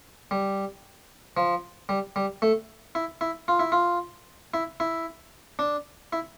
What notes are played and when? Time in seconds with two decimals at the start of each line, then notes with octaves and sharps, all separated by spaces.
0.31 G3
1.37 F3
1.89 G3
2.16 G3
2.42 A3
2.95 E4
3.21 E4
3.48 F4
3.59 E4
3.72 F4
4.54 E4
4.80 E4
5.59 D4
6.13 E4